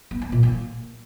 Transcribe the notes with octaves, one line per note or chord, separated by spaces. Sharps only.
B3
B3
A#2
A#3